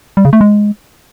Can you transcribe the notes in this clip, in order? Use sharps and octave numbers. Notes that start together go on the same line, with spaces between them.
G3
C#3
A3
G#3